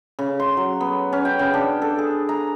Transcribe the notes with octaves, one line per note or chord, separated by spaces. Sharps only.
C#3
C6
F#3
B3
C#4
G5
C#3
D4
A4
G#4
A#5